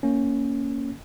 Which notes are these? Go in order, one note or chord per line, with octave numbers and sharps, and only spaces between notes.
A#3 C#4